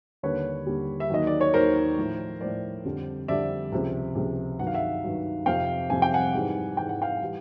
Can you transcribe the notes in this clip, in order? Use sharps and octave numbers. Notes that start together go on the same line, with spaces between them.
D#2 D3 G3 B4 C#5
D#2 D3 G3
E5
D#2 D#3 F#3 D#5
D5
C#5
D#2 D#3 F#3 A#4 C5
A2 F3
A2 F3 C5 D5
F2 D3 G3
F2 D3 G3 D5 E5
C#2 C3 F3
C#2 C3 F3
G2 D#3 F#3 F#5
F5
E5 F#5
G2 D#3 F#3
F2 C3 F3 F5 G5
F2 C3 F3 G#5
G5
F#5 G#5
G#2 E3 G3
G#2 E3 G3 G5
F#5
F5 G5
E3 G3